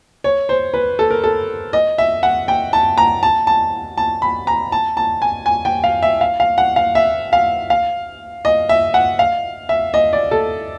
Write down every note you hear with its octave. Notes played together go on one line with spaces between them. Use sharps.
C#5
C5
B4
A4
A#4
A4
D#5
E5
F#5
G5
A5
A#5
A5
A5
A5
B5
A#5
A5
A5
G#5
G#5
G5
F5
E5
F5
F5
F#5
F5
E5
F5
F5
D#5
E5
F#5
F5
E5
D#5
D5
A4